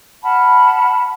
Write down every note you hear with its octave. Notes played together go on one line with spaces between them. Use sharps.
F#5 A5 B5 F6